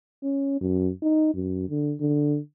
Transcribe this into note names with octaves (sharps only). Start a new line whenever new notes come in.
C#4
F#2
D#4
F#2
D3
D3